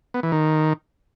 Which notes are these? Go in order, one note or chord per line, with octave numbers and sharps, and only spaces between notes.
B3
E3
D#3